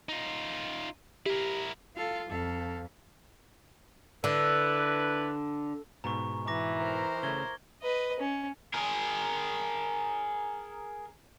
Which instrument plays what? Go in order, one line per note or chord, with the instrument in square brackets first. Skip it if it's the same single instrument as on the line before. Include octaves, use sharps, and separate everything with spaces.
[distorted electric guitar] D#4 F4
[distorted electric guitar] E4 A#4 [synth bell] G4
[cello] F4 [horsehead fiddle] A4 F5
[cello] F2 [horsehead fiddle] A4 F5
[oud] D3 [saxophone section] D4 E4 B4
[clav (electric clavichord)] G#2 B2 [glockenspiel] A#5 C#6
[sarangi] E3 [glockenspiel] A#5 D6 A#6
[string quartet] A#4 C5
[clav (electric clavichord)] C#3 A3 [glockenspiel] G#6 G7
[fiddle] B4 D#5
C#4
[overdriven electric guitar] G#4 A#4